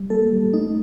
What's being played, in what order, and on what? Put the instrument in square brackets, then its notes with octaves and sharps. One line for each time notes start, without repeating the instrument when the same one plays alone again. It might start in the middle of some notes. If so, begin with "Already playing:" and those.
Already playing: [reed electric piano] G3
[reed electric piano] A#3 [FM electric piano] A4
[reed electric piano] G3
[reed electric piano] A3 [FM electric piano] D#4